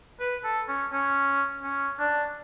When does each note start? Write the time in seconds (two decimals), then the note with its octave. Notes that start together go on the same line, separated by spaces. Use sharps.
0.20 B4
0.44 A4
0.68 C#4
0.92 C#4
1.63 C#4
1.99 D4